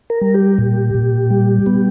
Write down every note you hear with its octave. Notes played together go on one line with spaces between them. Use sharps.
A#4
G3
G4
A#2
A#2
G3
B3